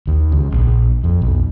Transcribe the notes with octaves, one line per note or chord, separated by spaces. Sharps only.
D#2
C#2
A#1
F2
B1